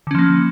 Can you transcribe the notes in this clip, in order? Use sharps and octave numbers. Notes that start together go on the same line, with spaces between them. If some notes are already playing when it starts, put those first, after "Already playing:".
D3 F3 A#3 C#4